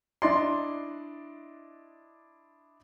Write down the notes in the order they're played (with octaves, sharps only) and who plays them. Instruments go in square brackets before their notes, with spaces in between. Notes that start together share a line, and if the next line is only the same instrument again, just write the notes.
[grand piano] D4 E4 D5 D#5 C6